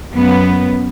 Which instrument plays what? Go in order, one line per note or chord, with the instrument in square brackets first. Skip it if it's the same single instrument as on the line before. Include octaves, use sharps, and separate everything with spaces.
[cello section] F#2 B3